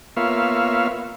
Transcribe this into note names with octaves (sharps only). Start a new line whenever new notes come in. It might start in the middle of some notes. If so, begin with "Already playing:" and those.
A#3 B3 F4 C#5 E5 F5